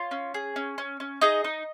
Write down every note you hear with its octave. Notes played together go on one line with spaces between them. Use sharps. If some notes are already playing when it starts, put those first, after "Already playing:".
Already playing: F4 C#5
C#4
G#4
C#4
C#4
C#4
D#4 G#4 D#5
D#4